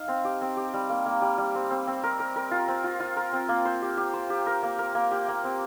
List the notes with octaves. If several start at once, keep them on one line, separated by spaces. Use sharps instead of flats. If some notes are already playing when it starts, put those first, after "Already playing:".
Already playing: D#4 F5
C4
G4
C4
G4
G3
A#3
A#3
G3
G3
C4
C4
C4
A#4
A#4
A#4
F4
C4
F4
F4
A#4
C4
A#3
C5
G4
G4
C5
G4
A#4
A#3
A#4
A#3
G4
A#3
C4